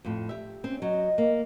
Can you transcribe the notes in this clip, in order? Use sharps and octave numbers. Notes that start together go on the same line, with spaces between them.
F2 A2
G4 E5
C4 C#4
F#3 D#5
A#3